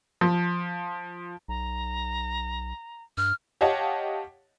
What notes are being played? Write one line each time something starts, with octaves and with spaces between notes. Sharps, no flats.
F3
B1 A#5
G2 F6
G4 C#5 D#5 F5 F#5 A5